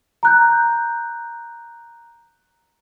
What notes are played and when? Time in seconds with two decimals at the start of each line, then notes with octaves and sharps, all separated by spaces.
0.23 A#5 F#6 G6